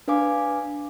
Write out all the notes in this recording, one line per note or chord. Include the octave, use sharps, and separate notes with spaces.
D4 B4 F5 G#5 D6